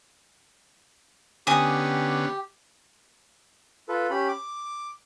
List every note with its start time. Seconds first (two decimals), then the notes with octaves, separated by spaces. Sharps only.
1.47 D3 B3 C#4 G4 G#5 D#6
3.89 F4 A4 B4
4.11 C#4 G4 B5
4.28 D6